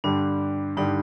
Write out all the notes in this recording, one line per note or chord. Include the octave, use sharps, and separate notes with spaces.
G2 D3 G3 D4
G2 D3 G3 D#4